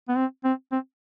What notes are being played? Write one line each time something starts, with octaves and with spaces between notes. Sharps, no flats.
B3
C4
C4
C4